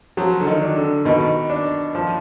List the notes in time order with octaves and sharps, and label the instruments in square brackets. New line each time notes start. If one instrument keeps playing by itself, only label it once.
[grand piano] F3 [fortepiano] F#3
[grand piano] D3
D#3
[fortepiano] D4
[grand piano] D3
[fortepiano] B2 [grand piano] D#3
[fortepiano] D4
F3